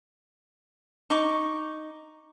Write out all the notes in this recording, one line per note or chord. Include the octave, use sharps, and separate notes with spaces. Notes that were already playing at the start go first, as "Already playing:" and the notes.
D#4 C#6 D6